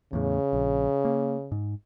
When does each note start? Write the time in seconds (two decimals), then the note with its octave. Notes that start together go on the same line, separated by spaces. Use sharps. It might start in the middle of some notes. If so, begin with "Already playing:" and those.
0.13 E2 A2 C#3
0.53 A#1
1.05 A#3
1.52 G#2